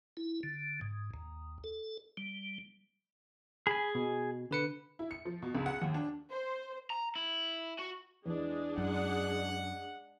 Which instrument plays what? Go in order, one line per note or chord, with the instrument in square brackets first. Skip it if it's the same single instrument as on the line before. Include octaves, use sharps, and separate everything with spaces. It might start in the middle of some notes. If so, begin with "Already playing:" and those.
[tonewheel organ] E4
D3
G#2
D#2
A4
G3
[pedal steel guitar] G#4 G#5 [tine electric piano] B5
[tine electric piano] B2
D3 B4 C#7
[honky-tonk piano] E4
C#7
F3
B2
C#2
F#5
D#2
D4
[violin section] C5
[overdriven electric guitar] A#5
E4
F#4
[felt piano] E2 [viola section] G#3 D4 G#4
[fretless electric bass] F#2 [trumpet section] F#5